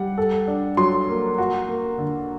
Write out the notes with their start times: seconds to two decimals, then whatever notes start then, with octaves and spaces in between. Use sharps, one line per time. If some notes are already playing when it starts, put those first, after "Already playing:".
Already playing: G3 F#5
0.18 A4
0.48 D4
0.77 F#3 C6
1.08 A#3
1.38 F#4
1.69 A#3
1.98 D3